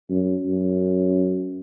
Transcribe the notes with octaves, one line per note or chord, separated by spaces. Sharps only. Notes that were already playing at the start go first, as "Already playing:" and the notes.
F#2
F#2